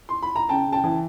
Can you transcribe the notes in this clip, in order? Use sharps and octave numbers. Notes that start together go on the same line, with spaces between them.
C6
B5
A#5
C#3 G5 A5
C#3
G5 A5
E3